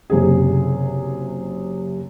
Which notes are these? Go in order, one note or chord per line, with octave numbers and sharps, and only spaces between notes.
F#1 C3 G#4